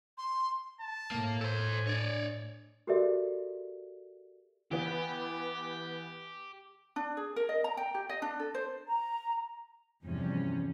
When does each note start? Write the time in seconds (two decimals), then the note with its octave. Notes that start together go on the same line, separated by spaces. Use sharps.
0.17 C6
0.80 A5
1.11 A2 A#3
1.41 A4 C5 G#5
1.87 D4 C#5 D5
2.87 F#4 G4 A4 A#4 D5 E5
4.71 E3 B3 G4
6.96 D4
7.17 G#4
7.36 A#4
7.49 D#5
7.64 A#5
7.77 G5
7.94 G4
8.09 D#5
8.22 D4
8.39 A4
8.54 C5
8.87 A#5
10.05 E2 G2 C3 F3 C#4